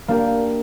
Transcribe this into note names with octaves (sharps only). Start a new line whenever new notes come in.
A#3 D4 G4 A#4